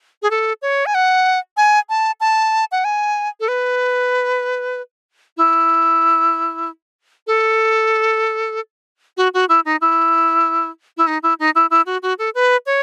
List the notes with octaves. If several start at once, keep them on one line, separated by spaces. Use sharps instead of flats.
G#4
A4
C#5
G#5
F#5
G#5
A5
A5
F#5
G#5
A4
B4
E4
A4
F#4
F#4
E4
D#4
E4
E4
D#4
E4
D#4
E4
E4
F#4
F#4
A4
B4
C#5